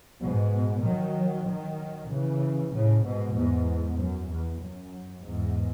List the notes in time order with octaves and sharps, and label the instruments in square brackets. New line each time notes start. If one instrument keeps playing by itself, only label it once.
[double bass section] G#2 B2
D#3 F#3
D#3 F#3
C#3 E3
A2 C#3
G#2 B2
E2 G#2
F#2
E2
F#2
E2 G#2